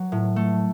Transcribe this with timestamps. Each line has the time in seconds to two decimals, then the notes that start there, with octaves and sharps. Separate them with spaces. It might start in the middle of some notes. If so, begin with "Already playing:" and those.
Already playing: F#3
0.12 A2
0.36 A3